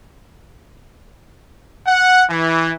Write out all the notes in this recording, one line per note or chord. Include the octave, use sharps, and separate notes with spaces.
F#5
E3